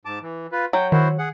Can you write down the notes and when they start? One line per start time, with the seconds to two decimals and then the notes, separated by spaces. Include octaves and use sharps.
0.05 G#2 A5 D6
0.22 E3
0.52 F4 B4
0.73 F#3 G5
0.92 D#3 E4 F#4 C5
1.19 G#4 F#5